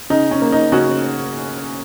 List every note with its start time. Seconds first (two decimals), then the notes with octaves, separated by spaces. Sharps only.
0.10 C#3 D#4
0.31 C#4
0.42 A#3
0.52 D#4
0.72 C#3 C#4 F#4